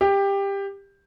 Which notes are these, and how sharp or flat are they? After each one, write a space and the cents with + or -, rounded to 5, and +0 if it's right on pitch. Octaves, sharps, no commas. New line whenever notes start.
G4 +15